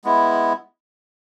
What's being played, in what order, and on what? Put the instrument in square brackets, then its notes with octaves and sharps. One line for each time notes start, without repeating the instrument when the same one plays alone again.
[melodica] G#3 B3 E4